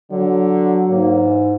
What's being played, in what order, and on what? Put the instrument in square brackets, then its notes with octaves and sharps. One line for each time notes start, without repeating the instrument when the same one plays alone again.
[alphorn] D3 [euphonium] F#3
[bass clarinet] G#2 [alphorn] A#3
[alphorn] E3